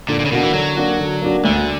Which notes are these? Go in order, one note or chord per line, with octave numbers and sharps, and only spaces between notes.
A#2 D3
A#2
C#3
B2 A#3 D4 F#4
E3
D3 F#3
A#3 D4 F#4
D3
A#3 D4 F#4
D2 D3